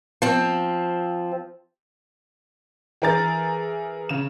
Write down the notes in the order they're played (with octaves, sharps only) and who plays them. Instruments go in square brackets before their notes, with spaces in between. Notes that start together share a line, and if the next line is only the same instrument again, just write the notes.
[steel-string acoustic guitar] F3 C4
[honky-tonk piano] E3 G#4 A#4 A#5 A6
C#3 E7